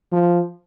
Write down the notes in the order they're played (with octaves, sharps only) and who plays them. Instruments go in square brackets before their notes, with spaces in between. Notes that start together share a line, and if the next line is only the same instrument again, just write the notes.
[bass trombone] F3